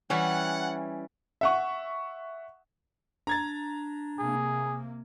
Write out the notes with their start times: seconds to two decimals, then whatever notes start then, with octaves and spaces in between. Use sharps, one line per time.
0.10 E3 G3 C#4 E4 F#5
1.41 E5 F#5 C#6
3.27 D4 A#5 G#6 A6
4.19 C3 A#3 G#4